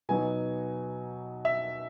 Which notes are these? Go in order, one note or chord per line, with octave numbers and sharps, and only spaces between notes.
B2 F#3 B3 D#4 G#5
E5